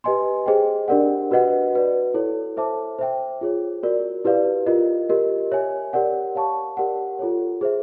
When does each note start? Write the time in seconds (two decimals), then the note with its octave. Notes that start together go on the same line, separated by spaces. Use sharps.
0.04 G4 B4 D#5 G#5 C6
0.46 G#4 C5 D#5 G5
0.88 D4 G4 A#4 D5 F#5
1.31 F#4 B4 D#5 F#5
1.73 F#4 B4 D5
2.14 E4 A4 C#5
2.57 A4 C5 E5 A5 D6
2.99 C5 E5 G5
3.41 F4 G#4 C#5
3.83 F#4 A#4 D5
4.25 E4 G4 B4 D5 F5
4.66 F4 A#4 D#5
5.09 G4 A#4 D#5
5.52 C#5 E5 G#5
5.93 G4 A#4 D5 F#5
6.35 C#5 F5 A5 C#6
6.77 G4 A#4 D5 F#5
7.19 F4 A4 C#5
7.61 G#4 C5 E5